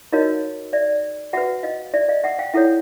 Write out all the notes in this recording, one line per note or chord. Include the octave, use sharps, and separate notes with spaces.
D#4 F#4 A#4 C#5 D#5 F5
D5 E5
F#4 B4 E5 F#5
D#5 F5
D5 E5
D#5 F5
E5 F#5
F5 G5
E4 A4 C#5 E5 F#5